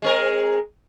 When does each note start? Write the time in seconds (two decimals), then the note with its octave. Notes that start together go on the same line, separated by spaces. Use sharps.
0.02 G#3 C4 A#4